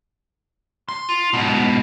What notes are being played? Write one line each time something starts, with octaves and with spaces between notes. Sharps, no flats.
C6
F4
G#2 B2